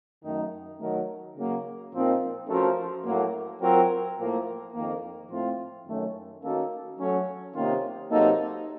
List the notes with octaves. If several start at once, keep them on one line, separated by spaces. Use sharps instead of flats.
F#2 D#3 A3 D#4
D#3 F#3 A3 D#4 A#4
C#3 F#3 A#3
A#2 F3 C4 D#4 A#4
F3 A3 C#4 F#4 A#4
A2 F#3 A#3
F#3 C4 F4 A#4
A2 F3 A#3
F2 D#3 A#3
A2 F3 A3 C4 F4
F#2 D#3 A3 C#4 A4
D#3 A#3 C#4 F#4 A4
F#3 A3 C#4 A4
C3 D#3 A#3 C#4 F4
C3 F#3 A#3 D#4 A4